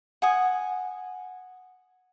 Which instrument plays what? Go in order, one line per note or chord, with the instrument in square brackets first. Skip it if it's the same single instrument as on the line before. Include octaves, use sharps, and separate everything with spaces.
[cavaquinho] F#5 G#5 D#6